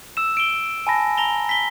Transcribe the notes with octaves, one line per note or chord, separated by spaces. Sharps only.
E6 E7
D7 G7
G#5 A5 B5 A#6
A#5 A#6 F7 G7
B6 G7